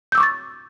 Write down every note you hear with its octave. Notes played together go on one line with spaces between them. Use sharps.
C#6 D6 E6 G6 A6